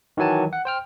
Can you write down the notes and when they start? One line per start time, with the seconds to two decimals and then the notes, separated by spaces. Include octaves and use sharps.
0.17 D#3 E3 F#3 G#5 A5
0.53 F#5
0.65 C5 G5 F6